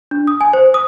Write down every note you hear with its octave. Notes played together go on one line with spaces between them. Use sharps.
D4
D#6
G#5
C5
D#6